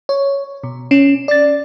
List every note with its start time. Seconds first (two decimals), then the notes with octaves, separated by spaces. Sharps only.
0.09 C#5
0.63 B2
0.91 C#4
1.28 D5 A6